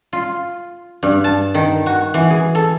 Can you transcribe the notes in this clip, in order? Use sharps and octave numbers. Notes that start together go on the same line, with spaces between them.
F4
G2
A5
D#3
F#4
E3
G#4
A4